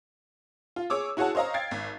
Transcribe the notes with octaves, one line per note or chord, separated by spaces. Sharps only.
F4
G#4 C#5 D6 E6
E4 F#4 G#4 C#5 F#5 A5
C5 C#5 D#5 F5 A#5
F5 G5 G#6 A6 C7
G#1